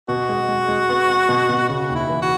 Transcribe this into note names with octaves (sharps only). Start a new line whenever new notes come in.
B2 F#4
G#3
G#3
G#3
B3
B3
B2
B2
C#3 F#4
D#2
E4
E3
F#4